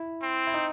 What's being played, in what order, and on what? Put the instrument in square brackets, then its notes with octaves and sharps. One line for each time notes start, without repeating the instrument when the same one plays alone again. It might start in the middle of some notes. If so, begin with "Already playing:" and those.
Already playing: [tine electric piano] E4
[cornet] C4
[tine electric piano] E4
D#4